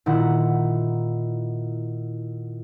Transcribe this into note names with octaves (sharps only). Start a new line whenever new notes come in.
A#2 D#3 E4 F#5